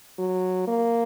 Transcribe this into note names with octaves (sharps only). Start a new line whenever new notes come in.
F#3
A#3